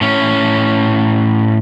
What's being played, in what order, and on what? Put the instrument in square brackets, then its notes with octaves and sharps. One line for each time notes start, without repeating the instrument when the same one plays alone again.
[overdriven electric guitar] A2 C#4